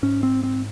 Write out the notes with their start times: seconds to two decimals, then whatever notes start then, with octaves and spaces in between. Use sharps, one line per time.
0.03 G#2 C#4
0.23 C4
0.43 C4